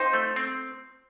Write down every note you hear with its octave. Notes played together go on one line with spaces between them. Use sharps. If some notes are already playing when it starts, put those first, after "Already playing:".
Already playing: D#4 C5
A3
C4